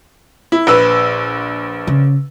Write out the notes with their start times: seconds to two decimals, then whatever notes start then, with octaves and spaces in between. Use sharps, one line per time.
0.52 E4
0.67 A#1 B4 E6
1.87 C#3